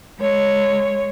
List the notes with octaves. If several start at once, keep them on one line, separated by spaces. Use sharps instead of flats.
G#3 C#5